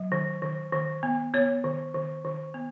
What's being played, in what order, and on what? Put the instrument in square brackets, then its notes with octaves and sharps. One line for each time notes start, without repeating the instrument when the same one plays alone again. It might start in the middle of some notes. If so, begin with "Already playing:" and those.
Already playing: [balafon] F#3
D#3
D#3
D#3
B3
B3 C#5
D#3
D#3
D#3
B3